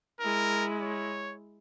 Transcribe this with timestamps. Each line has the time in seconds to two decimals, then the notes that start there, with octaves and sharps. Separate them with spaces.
0.21 G#3 E4 A#4
0.82 C#5